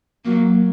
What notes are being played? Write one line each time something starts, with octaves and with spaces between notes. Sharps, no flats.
F#3 A#3